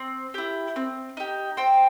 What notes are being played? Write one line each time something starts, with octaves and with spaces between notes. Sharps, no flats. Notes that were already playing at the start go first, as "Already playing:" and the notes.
Already playing: C4
E4 G4
C4
D#4 G4
C4 G5